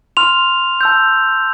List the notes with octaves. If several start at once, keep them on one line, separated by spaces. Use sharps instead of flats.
C6 F6 F7
A5 E6 G6